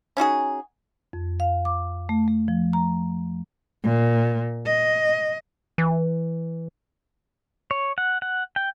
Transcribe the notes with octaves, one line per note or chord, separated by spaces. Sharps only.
C#4 D#4 F#4 G#4
F2
F5
D6
A3
A3
F3
A#5
A#2
D#5
E3
C#5
F#5
F#5
G5